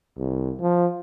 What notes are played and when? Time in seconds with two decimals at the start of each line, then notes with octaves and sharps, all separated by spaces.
0.18 C2
0.61 F3